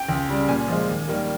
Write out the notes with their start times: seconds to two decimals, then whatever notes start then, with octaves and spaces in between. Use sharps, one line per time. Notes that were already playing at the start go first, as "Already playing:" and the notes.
Already playing: G5
0.08 C#2
0.29 C#3 G3
0.48 A#2 G#5
0.68 F3 G#3
0.89 D#2
1.08 D#3 G3 A#3